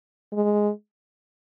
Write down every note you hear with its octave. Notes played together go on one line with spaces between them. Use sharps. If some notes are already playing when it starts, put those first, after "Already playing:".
G#3